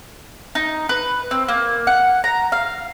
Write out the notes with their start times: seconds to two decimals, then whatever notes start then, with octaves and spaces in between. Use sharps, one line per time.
0.55 D#4
0.89 B4
1.31 C4
1.48 A#3
1.87 F#5
2.24 A#5
2.52 F5